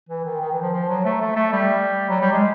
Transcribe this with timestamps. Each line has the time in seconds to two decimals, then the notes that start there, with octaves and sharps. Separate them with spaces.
0.09 E3
0.25 D#3
0.40 D#3
0.52 E3
0.62 F3
0.73 F3
0.89 F#3
1.05 A3
1.21 A3
1.36 A3
1.52 G3
2.09 F#3
2.21 G3
2.32 G#3